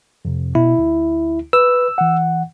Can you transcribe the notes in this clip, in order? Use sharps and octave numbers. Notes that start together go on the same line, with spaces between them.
F2 C3
B2 E4
D2
B4 E6
E3 F#5